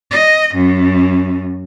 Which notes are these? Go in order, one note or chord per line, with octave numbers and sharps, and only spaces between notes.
D#5
F#2